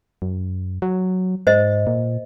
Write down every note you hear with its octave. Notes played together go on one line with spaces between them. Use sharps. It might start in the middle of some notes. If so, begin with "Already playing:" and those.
F#2
F#3
G#2 C5 D#5
A#2